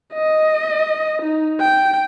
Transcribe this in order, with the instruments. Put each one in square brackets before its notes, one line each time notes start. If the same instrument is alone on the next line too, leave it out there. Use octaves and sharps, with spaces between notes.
[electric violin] D#5
D#4
G5